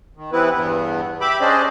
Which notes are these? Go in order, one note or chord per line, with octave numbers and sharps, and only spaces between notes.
D#3
E3 G3 B3 C4 E4 B4
E2 G2 B3
G4 E5 B5 D6
C#4 D4 G#4 C5 D5 D#5